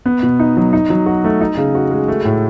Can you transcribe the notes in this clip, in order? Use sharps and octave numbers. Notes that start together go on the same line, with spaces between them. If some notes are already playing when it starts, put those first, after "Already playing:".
B3
B2
D#4
F#3
D#4
F#3
F#4
A3
D#4
C#3
F#4
G#3
A3
A2